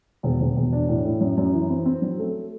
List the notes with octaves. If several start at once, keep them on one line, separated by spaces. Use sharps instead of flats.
E1
E1
E1
D4
A2
A2
F#2
F#2
E3
C4
C4
F#3
A3